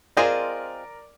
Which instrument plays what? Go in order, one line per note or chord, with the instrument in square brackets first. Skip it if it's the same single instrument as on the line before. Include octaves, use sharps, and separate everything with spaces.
[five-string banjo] C4 F4 G#4 C5 D#5 [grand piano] A#4 D5